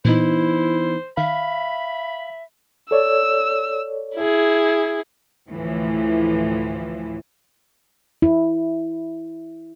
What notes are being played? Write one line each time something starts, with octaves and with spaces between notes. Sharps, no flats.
A#2 E3 B3 D#4 E4 C5
D#3 E5 F5 B5
A4 C#5 D5 E6
E4 G#4
D2 A2 E3 F3
E4